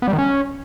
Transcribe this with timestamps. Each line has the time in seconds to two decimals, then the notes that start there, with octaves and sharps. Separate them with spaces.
0.02 B3
0.08 G3
0.13 D#3
0.18 C#4